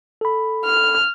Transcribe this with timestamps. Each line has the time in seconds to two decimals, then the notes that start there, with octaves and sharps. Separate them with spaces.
0.21 A4 B5
0.65 F6